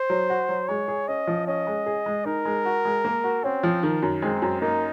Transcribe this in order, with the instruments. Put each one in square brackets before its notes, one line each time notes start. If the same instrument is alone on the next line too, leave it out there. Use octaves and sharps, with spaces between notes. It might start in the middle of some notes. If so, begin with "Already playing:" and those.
Already playing: [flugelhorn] C5
[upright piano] F#3
F#4
F#3
[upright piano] G#3 [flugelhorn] C#5
[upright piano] G#4
[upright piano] C#4 [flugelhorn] D#5
[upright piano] F3
[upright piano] C#4 [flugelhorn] D#5
[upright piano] G#3
G#4
G#3
[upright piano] D#4 [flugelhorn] A#4
[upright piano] G#3
F#4
G#3
A#3
F#4
[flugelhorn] C4 [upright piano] C#4
[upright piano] F3
D#3
F#2
[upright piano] G#3 [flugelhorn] C4
[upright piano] F#2
[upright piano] A#3 [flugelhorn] D#4